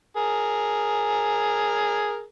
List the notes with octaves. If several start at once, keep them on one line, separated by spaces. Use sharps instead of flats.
G#4 A#4